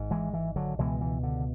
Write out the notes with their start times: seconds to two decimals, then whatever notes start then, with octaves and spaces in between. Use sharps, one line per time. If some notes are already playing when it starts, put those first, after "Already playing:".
Already playing: G#1 G#2
0.11 E3 G#3
0.34 E3
0.56 D3 F#3
0.79 C#2 B2 E3 G#3
1.01 E3
1.23 D3